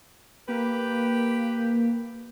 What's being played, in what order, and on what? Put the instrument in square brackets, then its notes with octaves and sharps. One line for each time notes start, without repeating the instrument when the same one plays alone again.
[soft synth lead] A#3 [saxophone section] G4 B4